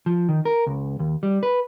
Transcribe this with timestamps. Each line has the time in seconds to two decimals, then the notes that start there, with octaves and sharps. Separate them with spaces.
0.06 F3
0.29 D#3
0.45 A#4
0.66 C#2
0.99 D#2
1.23 G3
1.43 B4